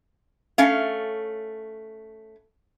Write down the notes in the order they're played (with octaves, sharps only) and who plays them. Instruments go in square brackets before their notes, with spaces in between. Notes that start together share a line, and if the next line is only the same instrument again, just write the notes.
[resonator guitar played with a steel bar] A3 C#4 F5